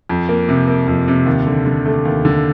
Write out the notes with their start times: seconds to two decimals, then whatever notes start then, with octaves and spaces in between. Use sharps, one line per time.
0.09 F2
0.29 A#3
0.49 C3
0.68 A#3
0.88 F2
1.08 C3
1.26 D#2
1.47 D3
1.66 D3
1.86 A3
2.05 D#2
2.25 D3